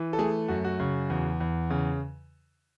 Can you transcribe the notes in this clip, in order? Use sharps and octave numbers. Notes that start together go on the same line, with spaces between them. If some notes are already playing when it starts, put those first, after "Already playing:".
Already playing: E3
A4
A3 G#4
F#2 F#4
F#4
C#3
E2
E2
C#3